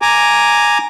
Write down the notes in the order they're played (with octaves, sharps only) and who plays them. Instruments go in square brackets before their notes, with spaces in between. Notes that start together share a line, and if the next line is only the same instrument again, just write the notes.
[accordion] G#5 A#5 D6